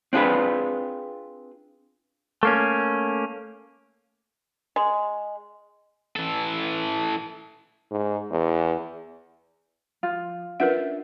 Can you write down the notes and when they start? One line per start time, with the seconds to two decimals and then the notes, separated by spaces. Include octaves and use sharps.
0.13 C4 D4 F4 G#4 B4
2.43 A3 A#3 C#4
4.76 G#3
6.16 E3 A4
7.91 G#2
8.31 E2
10.03 F3 F4
10.60 C#4 D4 F4 A#4 B4 E5 F#5